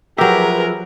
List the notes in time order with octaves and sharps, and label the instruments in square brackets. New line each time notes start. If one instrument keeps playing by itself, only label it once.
[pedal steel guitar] F3 E5 [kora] F#3 G4 [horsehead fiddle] G#4 B4 [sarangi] A#4